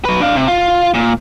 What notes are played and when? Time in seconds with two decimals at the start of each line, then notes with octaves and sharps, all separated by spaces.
0.05 F#3 B4
0.20 D4 F5
0.36 C3
0.48 F4
0.94 A#2